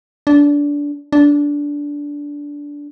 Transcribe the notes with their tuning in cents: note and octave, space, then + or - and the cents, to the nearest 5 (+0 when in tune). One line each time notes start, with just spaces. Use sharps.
D4 -20
D4 -15